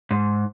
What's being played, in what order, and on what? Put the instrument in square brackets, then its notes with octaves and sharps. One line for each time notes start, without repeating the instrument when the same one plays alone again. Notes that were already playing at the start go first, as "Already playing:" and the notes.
[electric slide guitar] G#2